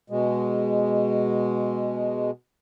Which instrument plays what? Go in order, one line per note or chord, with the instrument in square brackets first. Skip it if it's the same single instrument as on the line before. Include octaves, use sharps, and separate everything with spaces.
[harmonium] B2 G#3